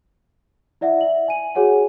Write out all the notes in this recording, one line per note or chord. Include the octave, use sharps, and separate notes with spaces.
E4 D5 E5 F#5
D5 E5 F#7
G#5 D#7
F#4 G#4 C#5 F#5 G#5